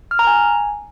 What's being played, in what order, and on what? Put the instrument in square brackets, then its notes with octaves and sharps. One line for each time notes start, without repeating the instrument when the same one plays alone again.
[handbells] F6
A#5
G#5